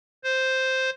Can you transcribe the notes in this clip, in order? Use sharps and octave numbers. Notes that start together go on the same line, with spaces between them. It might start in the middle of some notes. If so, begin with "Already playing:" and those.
C5